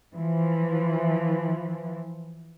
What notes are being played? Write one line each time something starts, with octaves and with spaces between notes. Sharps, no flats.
E3 F3